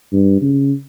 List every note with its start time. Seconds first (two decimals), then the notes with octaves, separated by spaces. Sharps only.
0.12 G2
0.42 C#3